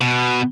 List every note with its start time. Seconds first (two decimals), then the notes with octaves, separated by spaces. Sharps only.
0.01 B2